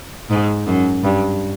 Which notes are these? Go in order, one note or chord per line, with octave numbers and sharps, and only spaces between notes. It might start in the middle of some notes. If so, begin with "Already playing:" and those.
G#2
F#2
G2